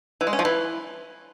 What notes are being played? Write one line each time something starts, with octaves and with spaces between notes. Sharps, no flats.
E3
G#3
C#4
F3
E3